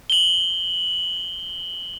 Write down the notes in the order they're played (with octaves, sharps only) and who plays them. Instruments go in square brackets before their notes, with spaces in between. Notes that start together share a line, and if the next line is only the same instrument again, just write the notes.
[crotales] F#7 G7